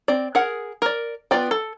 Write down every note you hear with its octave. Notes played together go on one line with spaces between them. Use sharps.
C4 D5
G#4 A#4 F#5
A#4 D5
B3 F4 D5 G5
A4